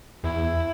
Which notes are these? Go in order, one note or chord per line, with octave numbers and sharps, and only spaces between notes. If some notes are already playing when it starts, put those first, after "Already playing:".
E2 E4